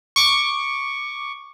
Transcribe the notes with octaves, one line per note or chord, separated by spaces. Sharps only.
C#6 D6